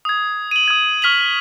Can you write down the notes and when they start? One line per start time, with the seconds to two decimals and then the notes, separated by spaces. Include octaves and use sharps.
0.05 D#6 G#6
0.51 D#7 F#7
0.68 D#6 G#6
1.02 C#6 F6 B6 F7 F#7